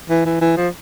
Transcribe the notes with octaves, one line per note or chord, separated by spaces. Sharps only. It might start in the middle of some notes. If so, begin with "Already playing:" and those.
E3
E3
E3
F3